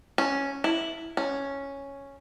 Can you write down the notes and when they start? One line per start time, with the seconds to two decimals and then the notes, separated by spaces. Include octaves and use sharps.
0.18 C#4
0.64 E4
1.17 C#4